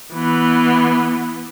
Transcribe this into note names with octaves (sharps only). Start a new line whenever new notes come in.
E3 B3